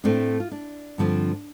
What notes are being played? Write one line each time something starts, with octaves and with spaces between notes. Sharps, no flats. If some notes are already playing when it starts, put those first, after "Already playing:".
A2 A3 C4 D4
F4
D4
G2 D3 F3 C4